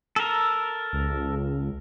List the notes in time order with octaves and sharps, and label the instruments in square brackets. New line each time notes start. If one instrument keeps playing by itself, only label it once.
[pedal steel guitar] A4 A#4
[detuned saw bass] C#2